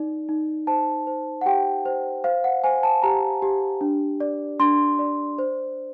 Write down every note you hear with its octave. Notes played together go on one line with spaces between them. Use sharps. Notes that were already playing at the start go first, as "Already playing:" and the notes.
Already playing: D#4 D5
D#4
C5 A5
C5
F#5
G4 G5
C5
C5 F5
F#5
C5 G#5
A5
G4 A#5
G4
D4
D5
D4 C6
D5
C5